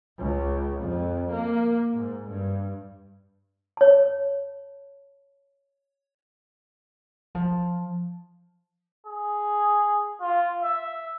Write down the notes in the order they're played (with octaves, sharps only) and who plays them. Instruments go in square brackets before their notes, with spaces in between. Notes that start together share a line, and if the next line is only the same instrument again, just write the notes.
[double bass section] C#2
F2
A#3
G#2
G2
[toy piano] C#5 A5
[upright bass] F3
[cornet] G#4
F4
E5